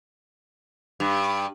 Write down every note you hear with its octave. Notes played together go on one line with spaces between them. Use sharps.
G2